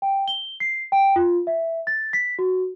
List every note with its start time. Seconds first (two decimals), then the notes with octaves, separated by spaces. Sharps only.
0.02 G5
0.28 G7
0.60 C7
0.92 G5
1.16 F4
1.47 E5
1.87 A6
2.13 B6
2.39 F#4